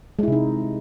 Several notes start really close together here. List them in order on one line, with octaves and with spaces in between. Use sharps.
G#3 E4 C3 D#4